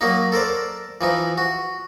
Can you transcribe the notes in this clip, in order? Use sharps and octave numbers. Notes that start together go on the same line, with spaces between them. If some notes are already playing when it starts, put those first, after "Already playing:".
F#3 A#3 D#4
A4 A#4 C5 D5
E3 F3 D#4
F#4